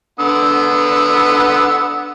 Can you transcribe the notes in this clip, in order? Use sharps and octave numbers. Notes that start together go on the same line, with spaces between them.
D3 B3 E6